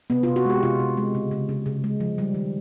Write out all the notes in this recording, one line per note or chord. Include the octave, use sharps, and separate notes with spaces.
C3 B3
F4
C3
F#4
G#3 G4
C3 F4
C3
G#3
C#3
C#3
C#3
C#3
G#3
F3
G3
D#3